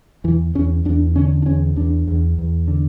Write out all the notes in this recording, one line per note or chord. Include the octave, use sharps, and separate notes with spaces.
E2 E3
E2 C#4
E2 D4
D3 C#4
D4
E2 C#4
E2 D4
E2
E2
D3